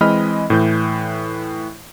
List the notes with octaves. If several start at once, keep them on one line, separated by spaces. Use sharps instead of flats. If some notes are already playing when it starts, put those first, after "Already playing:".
E3 G#3 C4 D#5 B5 F6
A2 E3 G6